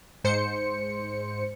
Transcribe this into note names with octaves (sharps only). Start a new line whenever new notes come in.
G#2 C5 C#7